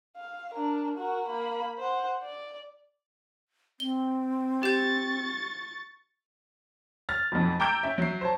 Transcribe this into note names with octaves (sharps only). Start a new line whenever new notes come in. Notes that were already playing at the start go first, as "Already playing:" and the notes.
F5
D4 A#4
F#4 A#4
A#3 B5
C5 F#5
D5
C4 G7
G4 C#6 G6 A6
F6 A6
B1 F2
G5 A#5 D6 E6 G6 D7
C#4 E5
F#3 E5 C7
C5 C#5 A5